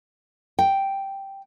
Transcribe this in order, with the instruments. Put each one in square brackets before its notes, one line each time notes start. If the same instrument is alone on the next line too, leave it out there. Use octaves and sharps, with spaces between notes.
[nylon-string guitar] G5